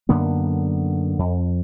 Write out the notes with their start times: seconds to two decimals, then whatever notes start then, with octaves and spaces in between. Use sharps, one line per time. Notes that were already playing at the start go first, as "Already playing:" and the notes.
0.09 F#2 D3 A#3 B3
1.19 F2